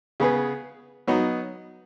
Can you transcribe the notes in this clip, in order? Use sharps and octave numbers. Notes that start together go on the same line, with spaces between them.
C#3 B3 G#4 B4
F#3 B3 D#4